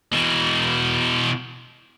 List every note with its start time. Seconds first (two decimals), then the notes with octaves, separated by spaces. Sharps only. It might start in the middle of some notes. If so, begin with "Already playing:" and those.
0.12 B2 E3